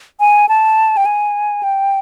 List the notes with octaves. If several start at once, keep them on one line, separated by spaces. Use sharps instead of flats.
G#5
A5
G5
G#5
G5